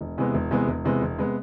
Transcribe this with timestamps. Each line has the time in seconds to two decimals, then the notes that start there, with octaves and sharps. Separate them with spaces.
0.01 E1
0.18 E2 C3 G#3 B3
0.34 E1
0.51 E2 C3 G#3 B3
0.68 E1
0.85 E2 C3 G#3 B3
1.02 E1
1.18 C3 G#3 B3